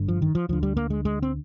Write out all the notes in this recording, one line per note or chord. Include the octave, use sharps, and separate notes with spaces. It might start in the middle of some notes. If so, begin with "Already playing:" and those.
Already playing: G1 G2 D3
F3
D#3
F3
D2 D3 F3
G3
A#3
G#3
G#3
C4